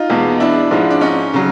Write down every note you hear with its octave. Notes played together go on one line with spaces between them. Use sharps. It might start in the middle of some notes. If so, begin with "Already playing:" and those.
Already playing: D#4 F4
E2 B2 G#3
D4 E4
G#2 F3 G#3
D4
C#4 D#4
C#3 F#3